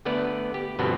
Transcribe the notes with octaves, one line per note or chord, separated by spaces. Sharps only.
D3 A3 B3 B4 D5
G4
G2 B2 D3 F3 B3 C4